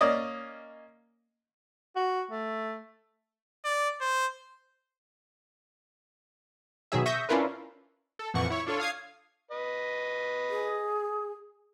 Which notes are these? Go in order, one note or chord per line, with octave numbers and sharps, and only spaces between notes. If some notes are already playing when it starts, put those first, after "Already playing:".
A#3 C#4 D5 D#5 D#6
F#4
A3
D5
C5
B2 D#3 F#3 G#4 E5
E5 C#6 D#6 G6 A#6
C#4 D4 E4 F4 A#4 B4
A4
F2 A#2 E3 F3 F#5 C#6
E4 C#5
D4 F4 A4 C#5
F5 D#6 G#6 C7
B4 D#5
G#4